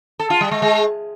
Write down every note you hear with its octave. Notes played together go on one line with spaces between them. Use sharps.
A4
F4
G3
G#3
G#3